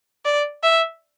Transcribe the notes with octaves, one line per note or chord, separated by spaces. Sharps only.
D5
E5